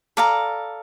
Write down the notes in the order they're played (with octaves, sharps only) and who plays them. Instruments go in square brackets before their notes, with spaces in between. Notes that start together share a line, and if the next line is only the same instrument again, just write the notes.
[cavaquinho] A4 D5 F5 A#5